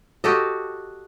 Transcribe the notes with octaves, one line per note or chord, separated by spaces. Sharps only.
F#4 G4 A4 D#5